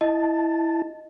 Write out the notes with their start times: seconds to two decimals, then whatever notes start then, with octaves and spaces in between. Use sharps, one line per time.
0.01 E4 D#5 A5